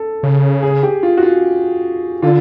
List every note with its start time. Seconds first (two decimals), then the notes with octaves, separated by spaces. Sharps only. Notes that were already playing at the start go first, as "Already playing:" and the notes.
Already playing: A4
0.23 C#3
0.63 G#4
0.83 G4
1.03 F4
1.18 F#4
1.23 F4
2.22 D3 F4